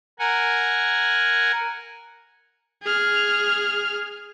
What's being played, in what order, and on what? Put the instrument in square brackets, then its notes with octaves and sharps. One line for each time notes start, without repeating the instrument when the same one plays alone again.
[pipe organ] A#4 F#5 G#5
[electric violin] G#4 F6